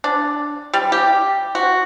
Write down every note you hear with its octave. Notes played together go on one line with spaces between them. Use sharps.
D4
G3
G4
F#4